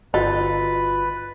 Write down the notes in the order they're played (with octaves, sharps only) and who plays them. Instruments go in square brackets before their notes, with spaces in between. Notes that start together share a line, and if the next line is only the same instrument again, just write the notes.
[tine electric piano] G1 F4 A6 [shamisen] D#4 [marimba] F#4 [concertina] B4